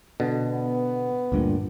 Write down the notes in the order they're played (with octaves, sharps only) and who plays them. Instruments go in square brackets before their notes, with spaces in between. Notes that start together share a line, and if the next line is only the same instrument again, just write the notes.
[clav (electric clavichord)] B2 D3
[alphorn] B3
[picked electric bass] D2 G2 A#2